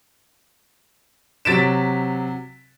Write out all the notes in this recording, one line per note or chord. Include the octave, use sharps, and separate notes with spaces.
C3 F#3 A6 B6 D7 E7